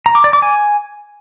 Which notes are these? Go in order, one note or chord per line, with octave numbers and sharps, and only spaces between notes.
A#5
D6
D5
D6
G#5